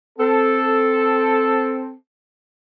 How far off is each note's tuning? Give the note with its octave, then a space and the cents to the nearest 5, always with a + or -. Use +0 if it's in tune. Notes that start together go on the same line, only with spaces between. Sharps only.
C4 +0 A4 +0